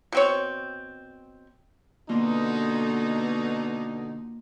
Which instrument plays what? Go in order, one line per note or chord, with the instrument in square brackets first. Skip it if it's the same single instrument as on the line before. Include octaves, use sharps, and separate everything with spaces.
[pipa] B2 C4 C#5
[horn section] B2 D3 D#4 [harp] A#3 F4